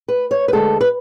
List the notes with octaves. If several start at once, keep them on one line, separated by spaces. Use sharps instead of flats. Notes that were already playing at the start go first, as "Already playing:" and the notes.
B4
C#5
B4
D2 D3 G#3 A4
B4